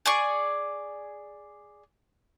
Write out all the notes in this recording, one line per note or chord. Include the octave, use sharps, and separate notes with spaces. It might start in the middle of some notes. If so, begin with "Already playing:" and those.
G#4 D5 C#6